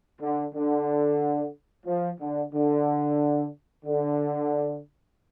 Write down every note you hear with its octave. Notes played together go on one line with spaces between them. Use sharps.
D3
D3
F3
D3
D3
D3